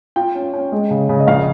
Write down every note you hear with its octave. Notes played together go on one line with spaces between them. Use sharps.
F4 G5
C#4
C#4
G#3
C#3
C#3
D#5
A#1 F5